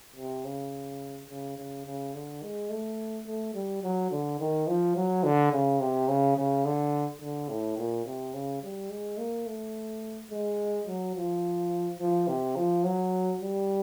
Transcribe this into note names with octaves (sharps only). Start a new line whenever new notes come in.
C3
C#3
C#3
C#3
C#3
D3
G#3
A3
A3
G3
F#3
D3
D#3
F3
F#3
D3
C#3
C3
C#3
C#3
D3
D3
A2
A#2
C3
C#3
G3
G#3
A#3
A3
G#3
F#3
F3
F3
C3
F3
F#3
G3